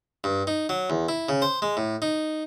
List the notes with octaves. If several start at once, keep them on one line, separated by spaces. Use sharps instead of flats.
G2
D#4
F#3
E2
E4
C#3
C5
G#3
A2
D#4